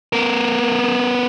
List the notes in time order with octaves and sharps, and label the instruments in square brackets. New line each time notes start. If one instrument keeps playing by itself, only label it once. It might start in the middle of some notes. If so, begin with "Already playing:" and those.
[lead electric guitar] B3 A#4